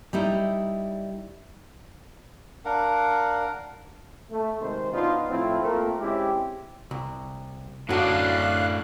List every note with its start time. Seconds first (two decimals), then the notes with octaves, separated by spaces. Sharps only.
0.13 G3 D#4 E4
2.65 D4 A#4 F5 F#5
4.31 A3
4.60 C3 D#3 G#3 C5
4.92 B2 B3 D4 D#4 F4
5.30 A2 F3 A3 C4 E4 F4
5.62 A3 A#3 C4 F4 A#4
5.99 G#3 C4 C#4 E4 G4
6.91 C2
7.89 F#2 A2 D4 F#4 F5 F#6